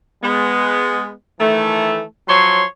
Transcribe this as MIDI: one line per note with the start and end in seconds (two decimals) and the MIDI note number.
0.23 1.12 56
0.23 1.12 59
1.40 2.03 51
1.40 2.03 52
1.40 2.03 57
2.28 2.64 53
2.28 2.64 54
2.28 2.64 73
2.28 2.64 84